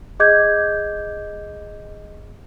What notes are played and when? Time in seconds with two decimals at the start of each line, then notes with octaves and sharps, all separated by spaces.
0.20 G#4 D#5 D6 G6 G#6